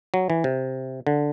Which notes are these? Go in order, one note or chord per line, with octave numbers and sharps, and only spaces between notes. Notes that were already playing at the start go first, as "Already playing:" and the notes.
F#3
E3
C3
D3